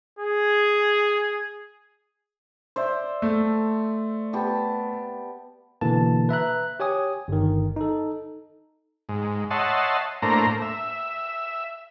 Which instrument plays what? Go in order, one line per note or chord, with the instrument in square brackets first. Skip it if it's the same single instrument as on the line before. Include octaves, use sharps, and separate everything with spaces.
[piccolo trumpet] G#4
[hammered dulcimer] C5 D5 E5
[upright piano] A3
[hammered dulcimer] B3 G4 A5
[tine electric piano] B2 D3 E3 A#3 A5
B4 E5 A#5 F#6
G4 C#5 G#5 D#6
G1 D#3
D#4 A4
[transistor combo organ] G#2
C#5 D#5 E5 F#5 A5 C6
A2 A3 A#3 D4 C5 A#5
E5